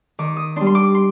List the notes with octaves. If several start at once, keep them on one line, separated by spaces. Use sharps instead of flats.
D#3 D6
D#6
G3 D4 C6
C6
D6
C6